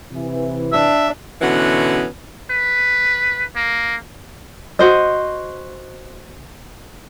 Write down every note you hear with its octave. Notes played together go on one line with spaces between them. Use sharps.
C3 E3
D4 E5
B2 D3 E3 B3 C#4 F#4
B4
A#3
F#4 C5 D#5